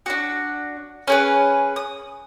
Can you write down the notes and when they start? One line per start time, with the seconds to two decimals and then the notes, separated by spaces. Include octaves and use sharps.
0.06 D4 F#4
1.08 C#4 G#4 B4
1.76 D#6